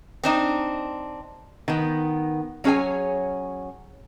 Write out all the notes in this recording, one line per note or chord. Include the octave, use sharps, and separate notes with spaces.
C4 D4 D#4
D#3 B3
F#3 C#4 G#4 C#5 G#5